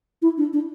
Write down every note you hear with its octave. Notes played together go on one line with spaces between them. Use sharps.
E4
D4
D4